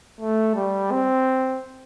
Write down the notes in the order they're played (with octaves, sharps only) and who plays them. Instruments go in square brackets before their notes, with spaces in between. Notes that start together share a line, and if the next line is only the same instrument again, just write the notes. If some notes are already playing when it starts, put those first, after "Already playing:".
[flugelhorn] A3
G3
C4